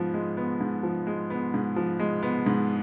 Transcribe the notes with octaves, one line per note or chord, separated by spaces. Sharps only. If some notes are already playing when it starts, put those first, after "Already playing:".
Already playing: G#2 F3 B3
G#3
B3
G#2
F3
G#3
B3
G#2
F3
G#3
B3
G#2